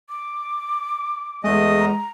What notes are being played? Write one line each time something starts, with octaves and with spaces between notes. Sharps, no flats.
D6
E2 G#3 A3 D#5
A#5